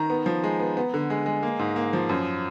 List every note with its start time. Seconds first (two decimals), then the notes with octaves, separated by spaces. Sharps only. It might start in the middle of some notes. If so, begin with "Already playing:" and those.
Already playing: D#3 A#5
0.10 B3
0.26 F3
0.44 G#3
0.60 B3
0.77 B3
0.94 D3
1.10 G#3
1.26 G#3
1.43 A#3
1.59 G#2
1.76 A#3
1.93 F3
2.09 F#2